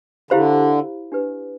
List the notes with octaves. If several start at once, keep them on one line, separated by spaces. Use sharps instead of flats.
D3 E4 G4 C5 F5 B5
D4 G4 B4